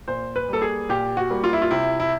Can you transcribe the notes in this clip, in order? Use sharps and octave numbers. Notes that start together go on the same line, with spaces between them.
A#2 C5
B4
G3 A#3 A4
G#4
A#2 G4
F#4
G3 A#3
F4
E4
F4
C3 E4
E4